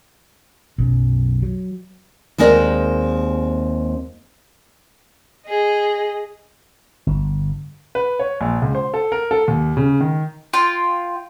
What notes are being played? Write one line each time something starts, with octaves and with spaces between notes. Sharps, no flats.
B1 F#2
F#3
D#2 G#3 C4 A#4 D5
G#4 D#5
G1
B4
C#5
A#1
C#2
C5
A4
A#4
A4
D#2
C#3
D#3
F4 G5